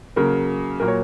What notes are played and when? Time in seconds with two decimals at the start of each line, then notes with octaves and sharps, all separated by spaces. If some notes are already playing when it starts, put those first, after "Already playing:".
0.16 C#3 F#3 A#3 A#4
0.80 A#2 F#3 A#3 A#4
0.88 C#5